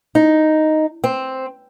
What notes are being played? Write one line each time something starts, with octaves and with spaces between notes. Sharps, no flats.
D#4
C4